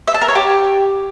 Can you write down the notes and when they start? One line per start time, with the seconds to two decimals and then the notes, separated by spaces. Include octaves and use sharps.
0.07 E5
0.14 A5
0.21 A#4
0.28 C#5
0.35 G4